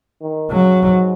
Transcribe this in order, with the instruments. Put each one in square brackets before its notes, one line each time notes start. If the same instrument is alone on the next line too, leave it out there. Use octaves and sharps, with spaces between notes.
[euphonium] D#3
[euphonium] C#3 [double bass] F#3
[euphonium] G#2